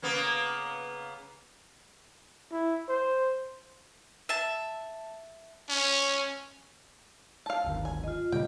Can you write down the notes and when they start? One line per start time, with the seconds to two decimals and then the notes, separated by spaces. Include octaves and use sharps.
0.02 C#3 A#3 B3
2.52 E4
2.89 C5
4.29 E5 A5
5.69 C#4
7.46 F5 A5
7.64 D1 G1 D#3
7.85 G#5
8.04 F4 D#5
8.32 A#2 C#3 G3 G5